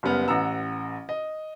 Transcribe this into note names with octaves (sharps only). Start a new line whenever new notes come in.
F#1 G3 B3 F6
A1 F#5 A#5 E6
D#5